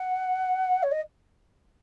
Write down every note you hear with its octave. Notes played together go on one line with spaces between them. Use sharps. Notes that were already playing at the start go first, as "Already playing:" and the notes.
Already playing: F#5
C#5
D#5